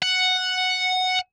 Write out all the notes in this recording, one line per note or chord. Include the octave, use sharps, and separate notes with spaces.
F#5